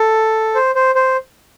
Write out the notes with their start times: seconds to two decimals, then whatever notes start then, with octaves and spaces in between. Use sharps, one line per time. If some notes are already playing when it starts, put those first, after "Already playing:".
Already playing: A4
0.55 C5
0.75 C5
0.95 C5